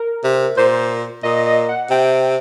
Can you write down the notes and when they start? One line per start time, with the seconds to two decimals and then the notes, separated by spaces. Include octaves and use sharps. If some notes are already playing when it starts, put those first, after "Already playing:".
Already playing: A#4
0.24 C3
0.57 A#2 C5
1.23 A#2 D#5
1.46 D#5
1.69 F#5
1.90 C3 G5